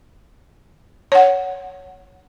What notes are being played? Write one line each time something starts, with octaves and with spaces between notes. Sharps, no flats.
C#5 F#5